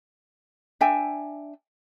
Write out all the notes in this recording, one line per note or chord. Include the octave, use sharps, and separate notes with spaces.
D4 E5 G5 G#5